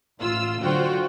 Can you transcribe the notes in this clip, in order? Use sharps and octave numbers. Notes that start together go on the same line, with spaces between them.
A1 F4 E6
D3 F#3 F4 F#4 C5 G5